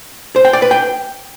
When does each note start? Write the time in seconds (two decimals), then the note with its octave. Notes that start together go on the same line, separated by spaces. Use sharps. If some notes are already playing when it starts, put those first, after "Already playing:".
0.36 C5
0.45 G5
0.53 D5
0.62 B4
0.71 G5